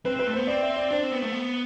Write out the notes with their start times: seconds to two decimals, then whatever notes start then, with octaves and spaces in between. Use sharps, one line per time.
0.05 C4 B4
0.16 C4 B4
0.27 A3
0.34 B3 C5
0.47 C4 D5
0.63 E5
0.77 D5
0.91 D4 C5
1.01 C4
1.12 B3
1.22 A3
1.32 B3